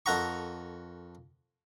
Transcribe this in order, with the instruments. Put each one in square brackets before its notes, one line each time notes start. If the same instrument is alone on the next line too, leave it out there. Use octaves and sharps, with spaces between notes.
[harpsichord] F2 A4 A#4 F#5 A#5 C#6